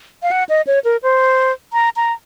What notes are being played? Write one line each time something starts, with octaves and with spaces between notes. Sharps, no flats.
F5
F#5
D#5
C#5
A#4
C5
A#5
A#5